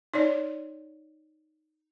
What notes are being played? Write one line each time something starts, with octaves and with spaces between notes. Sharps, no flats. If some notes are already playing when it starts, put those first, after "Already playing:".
D#4 C#5 D5